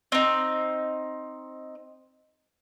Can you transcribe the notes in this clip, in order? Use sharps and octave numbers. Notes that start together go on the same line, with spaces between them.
C4 D#4